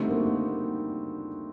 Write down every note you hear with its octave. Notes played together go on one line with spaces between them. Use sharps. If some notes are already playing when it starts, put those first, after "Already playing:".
Already playing: D3 G3 A3 C4 D#4 F#4
A#3